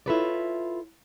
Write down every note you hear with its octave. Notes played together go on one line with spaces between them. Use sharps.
E4 F4 A4 B4 C#5 D5